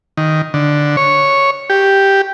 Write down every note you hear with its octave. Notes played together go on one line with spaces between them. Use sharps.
D#3
D3
C#5
G4